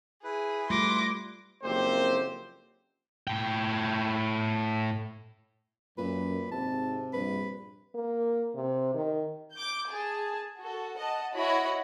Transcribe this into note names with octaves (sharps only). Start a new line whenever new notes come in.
E4 G#4 B4
G3 A3 F4 C6 D6 A#6
F#1 F2 A#3 C4 G4 C5
A2 G5
F#2 A#2 B4
G#1 C3 A5
A#1 G2 B4
A#3
C3
D#3
D6 G6
G#4 A5
F#4 A4
D#5 F#5 A5
E4 F#4 C#5 D#5 F#5 B5